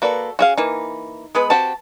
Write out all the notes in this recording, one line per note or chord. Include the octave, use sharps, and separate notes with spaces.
A#3 F#4 A4 B4 D5
C#4 F#4 G#4 F5
E3 A#3 D#4
G#3 B3 B4
C4 F#4 G4 A5